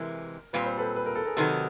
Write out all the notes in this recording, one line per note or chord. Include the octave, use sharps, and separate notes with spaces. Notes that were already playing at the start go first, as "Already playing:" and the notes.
Already playing: C3 E3 G#3 A#4
A#2 G3 C4 B4
C5
A4 B4
B4
A#4
A4
G#4 A#4
C3 D#3 F#3 A4 B4